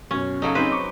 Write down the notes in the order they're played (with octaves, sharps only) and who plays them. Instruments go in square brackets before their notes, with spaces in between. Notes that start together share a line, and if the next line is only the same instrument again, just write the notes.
[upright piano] F#2 B2 [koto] C#4
[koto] C#3 F#3 D#4 [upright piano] A4
[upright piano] C4 D#4 G#4 [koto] B4 C5
[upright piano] C#6 D6